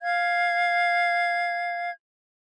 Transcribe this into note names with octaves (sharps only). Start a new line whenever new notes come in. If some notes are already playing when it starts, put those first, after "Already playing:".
F5 G#6